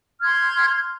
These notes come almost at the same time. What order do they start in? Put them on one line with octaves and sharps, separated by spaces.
F6 G#6 C6 G6